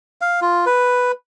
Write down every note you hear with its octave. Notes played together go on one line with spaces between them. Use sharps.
F5
F4
B4